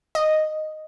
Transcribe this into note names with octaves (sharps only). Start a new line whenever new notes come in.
D#5